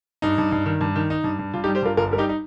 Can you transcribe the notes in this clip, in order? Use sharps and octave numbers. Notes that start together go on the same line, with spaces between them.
G2 D#4
G2
G2
D#3
G2
D#3
D#4
G2
G2
G2 F4
D#4 G4
G3
G4 C5
G2 F4 A#4
G1 F4 A#4
G3 A#4
D#4 G4
D#4